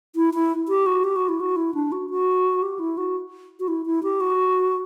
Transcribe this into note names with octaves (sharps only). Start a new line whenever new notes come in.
E4
E4
G4
F#4
G4
F#4
E4
F#4
E4
D4
F#4
F#4
G4
E4
F#4
F#4
E4
E4
G4
F#4